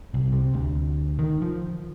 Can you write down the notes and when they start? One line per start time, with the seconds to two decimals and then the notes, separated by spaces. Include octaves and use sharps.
0.14 C2
0.32 C3
0.54 D2
1.19 D#3
1.42 F3